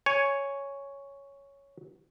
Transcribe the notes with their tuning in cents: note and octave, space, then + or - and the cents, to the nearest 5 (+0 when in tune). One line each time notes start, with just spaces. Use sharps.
C#5 +5 G#5 +0